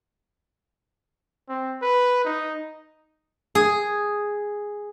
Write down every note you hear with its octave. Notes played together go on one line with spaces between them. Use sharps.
C4
B4
D#4
G#4